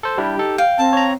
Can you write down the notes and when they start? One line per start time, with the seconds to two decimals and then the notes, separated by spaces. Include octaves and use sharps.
0.03 A4 C5
0.18 G3 D4 E4 G4
0.38 D#4 A4
0.58 F5 G5
0.78 C4 A5
0.93 C#5 A#5